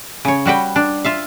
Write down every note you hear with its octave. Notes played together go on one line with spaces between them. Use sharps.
C#3 C#5
G3 F#4 B4 G5
D4
F4 E5 F5